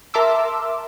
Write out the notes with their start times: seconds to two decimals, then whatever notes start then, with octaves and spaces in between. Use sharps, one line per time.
0.14 A#4 E5 A5 C6 D6 E6